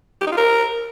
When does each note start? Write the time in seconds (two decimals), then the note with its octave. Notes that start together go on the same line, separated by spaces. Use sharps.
0.21 G4
0.27 D#4
0.32 F4
0.37 A#4